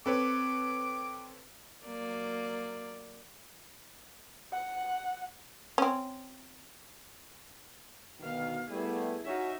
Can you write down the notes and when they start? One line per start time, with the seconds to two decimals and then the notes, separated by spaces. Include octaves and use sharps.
0.06 C4 A4 B4 C#5 D6
1.86 F#3 A#3 D5
4.53 F#5
5.78 C4 C#4
8.19 D2 B2 D#3 B3 F5
8.70 G3 A3 B3 E4 G#4
9.24 C#4 D#4 F#4 E5